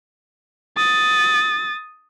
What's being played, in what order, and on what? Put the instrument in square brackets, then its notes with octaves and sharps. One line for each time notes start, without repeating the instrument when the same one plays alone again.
[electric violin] D#6 A6